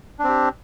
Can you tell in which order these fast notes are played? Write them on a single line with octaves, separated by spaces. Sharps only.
D4 C4 G4